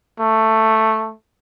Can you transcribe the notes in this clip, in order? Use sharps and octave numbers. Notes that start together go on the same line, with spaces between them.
A3